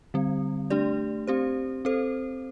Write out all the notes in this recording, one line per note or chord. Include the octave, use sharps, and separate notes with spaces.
D3 G3 C4
A3 D4 G4 D5
C4 G4 C5
C4 A4 C5